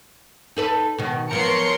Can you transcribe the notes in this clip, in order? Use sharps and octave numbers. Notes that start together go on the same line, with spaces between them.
D#4 A4 B4
B2 D#3
F3 F#3 B3 A#4 C6 C#7